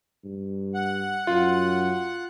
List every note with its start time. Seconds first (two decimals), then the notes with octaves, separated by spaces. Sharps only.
0.24 G2
0.74 F#5
1.27 F#2 F4